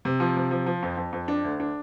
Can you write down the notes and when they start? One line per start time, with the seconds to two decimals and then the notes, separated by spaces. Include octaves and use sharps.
0.05 C3
0.20 F3
0.36 C3
0.51 F3
0.66 F3
0.82 F2
0.97 F2
1.13 F2
1.28 D4
1.44 D2
1.60 D4